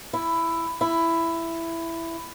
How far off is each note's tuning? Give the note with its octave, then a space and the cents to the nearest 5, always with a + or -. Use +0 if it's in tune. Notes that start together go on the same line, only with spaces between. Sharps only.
E4 +10
E4 +10